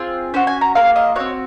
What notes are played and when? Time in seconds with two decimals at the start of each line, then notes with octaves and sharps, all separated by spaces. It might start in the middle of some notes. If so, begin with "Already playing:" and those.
Already playing: C4 F4 G#4
0.34 C#4 F#4 C5
0.47 G#5
0.61 A#5
0.75 A#3 F4 G#4 F5
0.96 D#5
1.16 C4 F#4 C#5